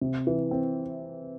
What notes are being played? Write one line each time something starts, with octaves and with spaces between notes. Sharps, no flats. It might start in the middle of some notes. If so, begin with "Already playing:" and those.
C3
E3
C4